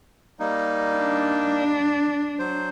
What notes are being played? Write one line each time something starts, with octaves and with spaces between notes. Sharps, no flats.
G3 A#3 D#4
D4
F#3 C5